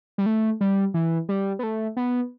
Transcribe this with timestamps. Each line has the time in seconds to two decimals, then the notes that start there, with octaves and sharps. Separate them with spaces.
0.18 G3
0.26 A3
0.61 G3
0.94 E3
1.29 G3
1.59 B3
1.63 A3
1.97 B3